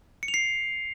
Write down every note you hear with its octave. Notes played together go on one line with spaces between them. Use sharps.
C#7
F7
C7